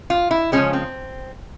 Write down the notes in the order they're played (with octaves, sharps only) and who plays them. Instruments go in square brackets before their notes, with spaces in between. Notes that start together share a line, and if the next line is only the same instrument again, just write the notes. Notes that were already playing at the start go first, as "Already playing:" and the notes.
[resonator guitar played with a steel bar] F4
E4
C#3 F3 G#3 C#4
C4